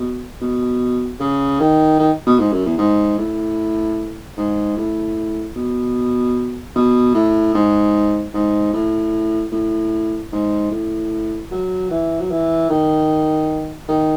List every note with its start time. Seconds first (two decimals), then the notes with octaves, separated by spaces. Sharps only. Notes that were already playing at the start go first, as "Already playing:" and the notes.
Already playing: B2
0.41 B2
1.20 C#3
1.60 D#3
1.99 D#3
2.26 B2
2.39 G#2
2.53 F#2
2.66 E2
2.78 G#2
3.18 A2
4.37 G#2
4.77 A2
5.56 B2
6.75 B2
7.14 A2
7.54 G#2
8.34 G#2
8.73 A2
9.52 A2
10.32 G#2
10.71 A2
11.51 F#3
11.91 E3
12.20 F#3
12.31 E3
12.70 D#3
13.88 D#3